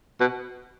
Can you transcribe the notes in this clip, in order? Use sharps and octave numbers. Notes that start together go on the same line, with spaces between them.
B2